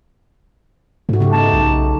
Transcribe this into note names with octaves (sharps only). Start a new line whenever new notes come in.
G#2 A3 F#4
C#3 A3 G4
A3 B3 D#4 A5
B1